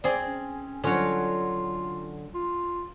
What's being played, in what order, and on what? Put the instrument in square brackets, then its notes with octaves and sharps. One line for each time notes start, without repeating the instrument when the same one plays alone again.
[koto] C4 G#4 [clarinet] D5
[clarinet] C#4
[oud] D3 F#3 [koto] C#4 C#5 [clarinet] F4
[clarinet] F4